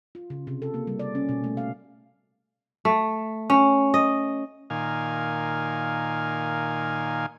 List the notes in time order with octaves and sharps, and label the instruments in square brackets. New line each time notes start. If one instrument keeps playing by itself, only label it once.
[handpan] F4
C#3
C3
A4
A#3
G3
D5
C#4
B2
A3
F5
[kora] A3
C#4
D#5
[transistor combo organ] A#2 D#3 F5 G#5